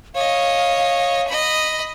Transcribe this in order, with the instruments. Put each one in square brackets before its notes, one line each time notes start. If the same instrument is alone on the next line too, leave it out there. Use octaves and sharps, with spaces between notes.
[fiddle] C#5 D#5 [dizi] F5
[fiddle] D#5 B5